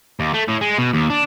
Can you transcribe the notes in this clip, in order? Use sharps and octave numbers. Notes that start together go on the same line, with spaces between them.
D#2
A3
A2
G#3
B2
D#2
D4